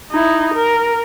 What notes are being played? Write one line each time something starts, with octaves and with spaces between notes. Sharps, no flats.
D#4 E4
A#4